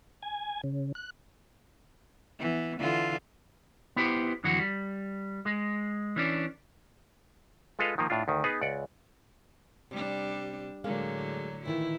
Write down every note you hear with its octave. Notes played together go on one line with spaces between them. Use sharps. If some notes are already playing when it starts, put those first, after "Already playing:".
G#5
C#3
F#6
E3 B3
D3 E3 F4
B3 E4 G4 C5
F2 D3 E3 F#3 F#4
G3
G#3
E3 C#4 D4
G#3 F4 A4 B4 D#5 F5
D#3 F3 A#3
A2 D4 F4
D2 D#3
B3 D#4 G#4 B4
C#2 D5 F#5
C3 G3 D4
A2 D3 F#3 G#3 A#3 F5
A#2 D#3 E3 E4